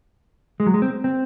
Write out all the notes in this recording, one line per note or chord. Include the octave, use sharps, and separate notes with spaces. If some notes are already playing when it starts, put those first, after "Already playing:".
G#3
F#3
G#3
C4
C4